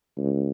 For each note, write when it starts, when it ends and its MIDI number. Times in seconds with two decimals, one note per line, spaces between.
0.17 0.50 37